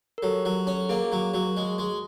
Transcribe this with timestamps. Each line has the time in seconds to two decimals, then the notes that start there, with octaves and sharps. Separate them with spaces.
0.18 A#4
0.23 F#3 G4 A4
0.45 F#3
0.67 C#4
0.89 A#3 G#4 A#4
1.12 F#3
1.34 F#3
1.57 G#3
1.78 G#3